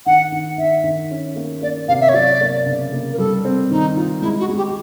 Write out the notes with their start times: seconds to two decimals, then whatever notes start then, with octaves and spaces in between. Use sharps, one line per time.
0.06 D#3 F#5
0.32 D#3
0.58 D#3 E5
0.84 D#3
1.11 C#4
1.36 A#3
1.62 A#3 D5
1.88 C3 F5
2.01 E5
2.09 C#5
2.14 F#3 D5
2.41 A#3
2.66 C#3
2.93 A#3
3.13 A#4
3.18 G3 A4
3.45 C4
3.71 D#3 D#4
3.97 F4
4.22 G#3 E4
4.40 F#4
4.49 G#3
4.57 G4